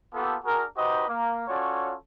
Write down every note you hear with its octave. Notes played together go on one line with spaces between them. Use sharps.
A#3 B3 F4 G4 A4
D4 F#4 G#4 A#4
D#4 F#4 G4 B4 C5 D#5
A#3
C#4 F4 F#4 A4 C#5 D5